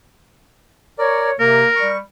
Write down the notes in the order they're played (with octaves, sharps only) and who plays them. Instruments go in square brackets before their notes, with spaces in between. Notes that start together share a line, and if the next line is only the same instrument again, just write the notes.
[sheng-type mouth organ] A#4 D5 [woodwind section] C#5
[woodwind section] C3 [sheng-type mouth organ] A#3 [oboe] A#4
[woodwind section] G3 [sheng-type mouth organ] C#6